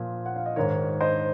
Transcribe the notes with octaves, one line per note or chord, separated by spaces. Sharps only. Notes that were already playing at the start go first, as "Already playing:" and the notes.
Already playing: A#2 F3
F#5
F5
D#5
G#2 D#3 A#4 C#5
C5 D#5